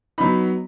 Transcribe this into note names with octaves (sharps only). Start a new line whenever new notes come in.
F#3 B3 D#4 B5